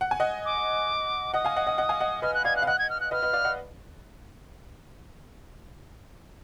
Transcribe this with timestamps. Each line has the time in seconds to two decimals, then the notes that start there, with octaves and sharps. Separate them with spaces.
0.01 F#5
0.11 G#5
0.20 D#5 F#5
0.45 D6
1.34 D#5 F#5 D#6
1.45 F5 G#5
1.56 D#5 F#5
1.67 D#5 F#5
1.78 D#5 F#5
1.89 F5 G#5
2.00 D#5 F#5
2.22 B4 D#5 F6
2.34 F#6
2.45 D5 F5 G#6
2.56 F#6
2.62 F5
2.67 D#5 F#5 F#6
2.79 G#6
2.90 F6
3.00 F#6
3.11 B4 D#5 F6
3.23 B4 D#5
3.33 D5 F5
3.45 D#5 F#5